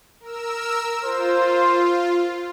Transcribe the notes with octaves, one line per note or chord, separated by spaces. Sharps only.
A#4 E6
F4 C5